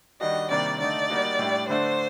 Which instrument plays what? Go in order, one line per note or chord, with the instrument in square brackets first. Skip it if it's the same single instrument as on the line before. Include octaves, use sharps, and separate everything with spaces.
[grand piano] D#3 G3 D4 F#4 [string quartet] D#5
[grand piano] C3 D#3 G3 A#3 D4 [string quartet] D5
[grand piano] D3 A3 D#4 [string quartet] D5
[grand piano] G3 A#3 D#4 F#4
A2 G3 D4 G4
[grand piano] D3 A3 D4 [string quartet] C5